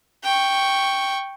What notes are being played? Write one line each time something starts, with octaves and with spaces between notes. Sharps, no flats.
G5 C#6